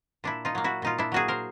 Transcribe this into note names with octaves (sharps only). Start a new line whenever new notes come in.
A#2 D4 E4
D#4 F4
F#3 A#3
E4 F#4
A#2 D#4 F4
D4 E4
F#3 A#3 F#4 G#4
A#4 C5